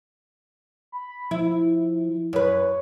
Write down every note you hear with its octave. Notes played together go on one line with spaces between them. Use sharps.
B5
F3 E4
F#2 B4 C#5